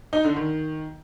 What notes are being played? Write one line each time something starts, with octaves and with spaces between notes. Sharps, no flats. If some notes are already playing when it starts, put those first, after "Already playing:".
D#4
D3
D#3